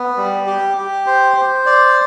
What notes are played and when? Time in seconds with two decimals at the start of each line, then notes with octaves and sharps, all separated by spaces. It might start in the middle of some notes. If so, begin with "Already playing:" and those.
Already playing: B3
0.17 G3
0.47 G4
0.77 G4
1.07 C5
1.37 C5
1.66 D5